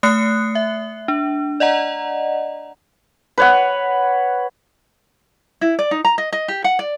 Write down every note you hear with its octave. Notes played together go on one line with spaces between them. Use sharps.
A3 D#6 F#6 C7 C#7
E5
D4
D5 D#5 F#5 A#5
B4 C#5 F#5
E4
D5
D#4
A#5
D#5
D#5
G4
F#5
D5